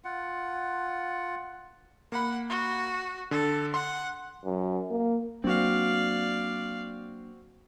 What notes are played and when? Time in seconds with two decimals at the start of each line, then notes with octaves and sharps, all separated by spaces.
0.05 F4 F#5
2.12 A#3 F#5 B5
2.49 F#4
3.31 D3 A4
3.74 F#5 C6
4.45 F#2
4.91 A#3
5.44 F#3 A#3 C4 D4 F#4 D5 F5